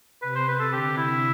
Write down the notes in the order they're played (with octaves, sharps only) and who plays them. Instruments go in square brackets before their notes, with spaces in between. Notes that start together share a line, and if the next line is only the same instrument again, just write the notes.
[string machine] C3 [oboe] B4
[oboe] C5
B4
A4
[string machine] D3 [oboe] G4
[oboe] E4